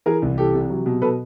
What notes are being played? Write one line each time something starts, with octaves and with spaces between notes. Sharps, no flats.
E3 G#4 A#4
C2
E3 G4 A4
C3
F#3
B2
B2 A4 B4